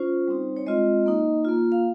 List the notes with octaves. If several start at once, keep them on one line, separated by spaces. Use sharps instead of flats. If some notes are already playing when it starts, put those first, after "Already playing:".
Already playing: C#4 F4 C5
G3 C4 D#4
C#5
G#3 C4 F4 D#5
A#3 D#4
A#3 F4
F5